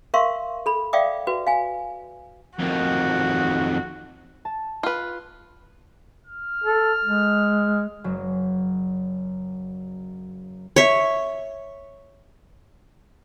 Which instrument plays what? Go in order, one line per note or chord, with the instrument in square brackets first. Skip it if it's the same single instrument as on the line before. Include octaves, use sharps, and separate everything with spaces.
[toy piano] A#4 E5 F5 C6 C#6
A4 B5
D5 E5 F5 G5 D6 D#6
F#4 B4
F5 G#5
[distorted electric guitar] F2 D#3 [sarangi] F#4
[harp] A5
[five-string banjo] F4 B4
[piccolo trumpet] F6
[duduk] A4
G#3
[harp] F#1 F#3
[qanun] C#5 E5